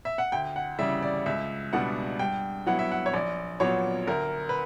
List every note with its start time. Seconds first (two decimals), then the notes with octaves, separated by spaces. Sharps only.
0.05 E5
0.18 F#5
0.32 D2 G5
0.56 F#5
0.79 C#3 E3 G3 E5
1.03 D5
1.26 C#2 E5
1.73 B2 G3 B3 D4 F#5
2.19 G2 G5
2.67 F#3 B3 E4 F#5
2.79 E5
2.91 F#5
3.06 C#5
3.14 A#1 D5
3.60 A#2 F#3 B3 C#5
4.07 D2 A#4
4.49 B4